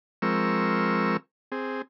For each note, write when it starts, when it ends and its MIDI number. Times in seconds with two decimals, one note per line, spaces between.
0.22 1.17 53
0.22 1.17 56
0.22 1.17 60
0.22 1.17 70
0.22 1.17 85
0.22 1.17 88
1.52 1.82 60
1.52 1.82 68